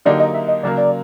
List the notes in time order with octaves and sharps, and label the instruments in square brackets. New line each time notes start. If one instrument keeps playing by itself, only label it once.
[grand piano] D3 F#3 A#3 D#4 G4 [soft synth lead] D5
[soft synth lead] D#5
E5
D#5
[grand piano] C#3 F#3 A#3 [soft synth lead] D5
[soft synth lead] D5